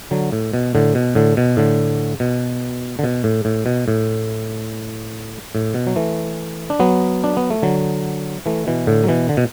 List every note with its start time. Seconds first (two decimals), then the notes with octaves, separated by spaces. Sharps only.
0.11 D3 F#3
0.32 A2
0.53 B2
0.75 A2 D3
0.95 B2
1.15 A2 D3
1.37 B2
1.57 A2 D3
2.20 B2
2.99 D3
3.04 B2
3.24 A2
3.45 A2
3.66 B2
3.88 A2
5.55 A2
5.74 B2
5.87 F#3
5.96 E3 A3
6.70 D4
6.79 F#3 B3
7.24 D4
7.37 B3
7.50 A3
7.62 D3 F#3
8.46 E3 A3
8.67 B2 E3
8.87 A2 D3
9.04 F#3
9.08 B2 E3
9.29 D3
9.37 B2